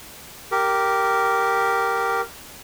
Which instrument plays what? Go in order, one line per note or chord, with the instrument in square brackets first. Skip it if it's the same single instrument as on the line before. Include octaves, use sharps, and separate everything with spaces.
[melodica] G4 A#4